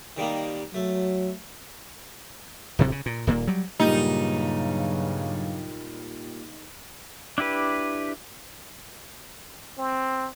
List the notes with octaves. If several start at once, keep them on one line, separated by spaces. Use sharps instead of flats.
D#3 G3 A#3
F#3 A3
D1 D2 C3 F#3
C#3
A#2
D#1 A#2 A#3
F#3 G3
G2 A#2 C#3 F#3 G3 D#4
D4 E4 G4 B4
C4